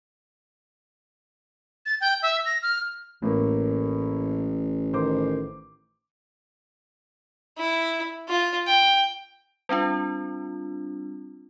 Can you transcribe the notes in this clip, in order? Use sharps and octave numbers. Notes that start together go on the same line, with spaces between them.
A6
G5
E5
A#6
F6
A1 A2 A#3
D#3 C5 D6
E4
F4
G5
G3 C4 D4 F4